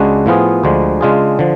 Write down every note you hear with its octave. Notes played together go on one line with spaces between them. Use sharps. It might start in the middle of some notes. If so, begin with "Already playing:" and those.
Already playing: C#2 C#3 G#3 D4 F#4
A2 F3 B3 F4 G#4
D2 D3 F3 G#3
C#3 G#3 D4 F4 G#4
D3 F3